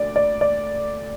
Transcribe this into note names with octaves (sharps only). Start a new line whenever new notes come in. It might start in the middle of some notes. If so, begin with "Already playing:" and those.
Already playing: D2 D5
D5
D5